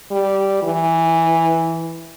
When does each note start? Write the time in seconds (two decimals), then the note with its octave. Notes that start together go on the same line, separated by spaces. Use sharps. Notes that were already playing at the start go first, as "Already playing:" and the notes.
0.11 G3
0.63 E3